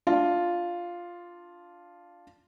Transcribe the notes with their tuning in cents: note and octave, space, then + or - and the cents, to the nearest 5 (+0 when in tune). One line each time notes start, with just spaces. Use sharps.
D4 +0 F4 +0